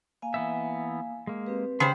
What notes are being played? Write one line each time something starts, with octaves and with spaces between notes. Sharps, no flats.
A#3 F5 G#5
E3 B3 E5
G#3 A#3
C4 G4 B4
C#3 G4 C5 G5 B5 C6